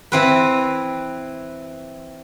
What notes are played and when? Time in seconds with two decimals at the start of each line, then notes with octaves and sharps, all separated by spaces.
0.12 E3 C4 B4